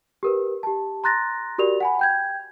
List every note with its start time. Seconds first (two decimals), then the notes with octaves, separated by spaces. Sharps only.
0.23 G4 A#4 B4
0.63 G4 A5
1.04 A#5 C6 F#6 A6 A#6
1.58 F#4 G4 A#4 D5 F7
1.80 F#5 G#5 B5
1.99 G5 G6 G#6